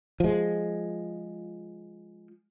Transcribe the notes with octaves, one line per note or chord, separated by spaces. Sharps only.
F3 G#3